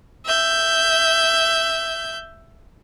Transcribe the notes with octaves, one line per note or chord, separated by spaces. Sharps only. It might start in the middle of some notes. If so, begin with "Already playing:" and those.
E5 G6